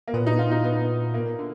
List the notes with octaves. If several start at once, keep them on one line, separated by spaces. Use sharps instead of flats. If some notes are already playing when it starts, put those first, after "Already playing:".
A#3
A#2 B3
D#4
F4
D#4
B3
A#3
D3